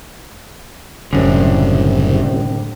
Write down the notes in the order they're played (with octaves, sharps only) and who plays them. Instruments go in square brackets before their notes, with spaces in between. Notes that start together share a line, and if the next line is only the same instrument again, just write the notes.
[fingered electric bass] F#1 F#2 [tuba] C2 [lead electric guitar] A2 D3 [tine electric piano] C#4